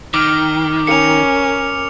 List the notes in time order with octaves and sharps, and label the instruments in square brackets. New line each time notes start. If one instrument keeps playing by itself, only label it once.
[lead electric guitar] D#3 [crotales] D6 F6
[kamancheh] C#4 A#4 [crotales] C#7 F7